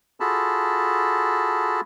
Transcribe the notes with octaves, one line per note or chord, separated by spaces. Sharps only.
F4 F#4 G#4 A4 A5 B5